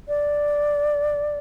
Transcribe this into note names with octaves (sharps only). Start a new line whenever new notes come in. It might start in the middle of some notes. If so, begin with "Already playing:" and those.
D5